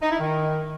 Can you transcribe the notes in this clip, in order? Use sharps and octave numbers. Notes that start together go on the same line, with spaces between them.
D#4
E4
D#3